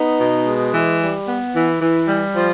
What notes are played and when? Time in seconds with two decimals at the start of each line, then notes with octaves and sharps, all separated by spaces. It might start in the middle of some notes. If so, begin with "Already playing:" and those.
Already playing: B3 D#4
0.19 B2
0.46 G#3
0.73 E3
1.00 G3
1.27 B3
1.54 E3
1.81 E3
2.08 G3
2.35 F3